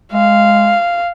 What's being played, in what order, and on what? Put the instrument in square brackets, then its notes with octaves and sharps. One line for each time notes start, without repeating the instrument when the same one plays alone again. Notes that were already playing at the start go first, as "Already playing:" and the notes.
[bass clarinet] G#3 [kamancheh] F5